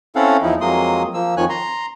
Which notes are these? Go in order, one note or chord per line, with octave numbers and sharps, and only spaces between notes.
C4 C#4 E4 A4 F5 F#5
E2 F3 D#4 E4
F2 F#3 G#3 A#3 C6 D#6
F3 A#3 E6
F2 D#3 F3 C#5 G#5 F#6
A#5 C6